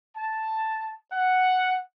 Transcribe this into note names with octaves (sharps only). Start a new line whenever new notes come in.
A5
F#5